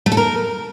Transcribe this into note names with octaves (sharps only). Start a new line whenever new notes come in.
A3
A4
A#4